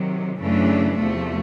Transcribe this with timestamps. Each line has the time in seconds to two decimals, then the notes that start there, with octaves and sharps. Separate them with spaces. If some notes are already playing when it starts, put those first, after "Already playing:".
Already playing: C3 D#3 F#3
0.38 F#2 C#3 E3 A3 D4
0.97 E2 C3 F3 A3